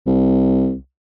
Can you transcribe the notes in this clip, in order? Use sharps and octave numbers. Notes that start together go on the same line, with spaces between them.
C2